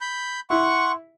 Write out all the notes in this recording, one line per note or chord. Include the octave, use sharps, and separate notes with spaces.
B5 G6
E4 F#5 C6 C#6